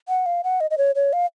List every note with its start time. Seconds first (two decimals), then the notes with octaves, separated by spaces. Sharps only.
0.09 F#5
0.26 F5
0.44 F#5
0.61 D#5
0.71 D#5
0.78 C#5
0.95 C#5
1.13 F5